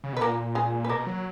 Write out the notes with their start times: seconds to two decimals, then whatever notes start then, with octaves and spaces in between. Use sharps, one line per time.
0.04 C#3
0.13 B2 B4
0.21 A#2 A#3 A#4
0.55 G#3 G#4
0.85 B4
0.89 B2 A#3 A#4
1.07 F#3